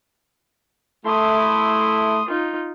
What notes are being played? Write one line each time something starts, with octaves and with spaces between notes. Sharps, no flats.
A3 E4 C6 D#6
D#4 F4